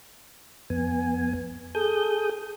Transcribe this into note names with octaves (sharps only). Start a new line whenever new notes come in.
F2 B3 G#5
G#4 A4 D#6 G6